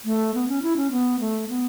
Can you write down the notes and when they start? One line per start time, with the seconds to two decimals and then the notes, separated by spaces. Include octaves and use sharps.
0.05 A3
0.34 B3
0.48 C#4
0.62 E4
0.77 C#4
0.91 B3
1.20 A3
1.49 B3